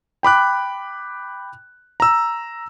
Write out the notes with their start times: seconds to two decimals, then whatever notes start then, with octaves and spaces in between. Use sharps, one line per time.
0.23 G5 B5 D6 F#6
2.00 A#5 E6